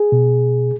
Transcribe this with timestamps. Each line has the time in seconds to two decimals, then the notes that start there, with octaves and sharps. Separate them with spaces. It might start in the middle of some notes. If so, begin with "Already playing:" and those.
Already playing: G#4
0.12 B2